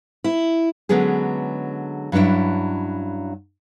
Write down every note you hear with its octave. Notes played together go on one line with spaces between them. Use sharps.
E4
D3 F#3 G#3 B3 C#4 G#4
G2 F#3 C#4 D4 E4